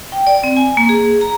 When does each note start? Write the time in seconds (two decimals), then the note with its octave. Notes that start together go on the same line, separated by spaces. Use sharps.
0.12 G5
0.27 D5
0.44 C4
0.57 G#5
0.77 A#3
0.89 G#4
1.21 A#5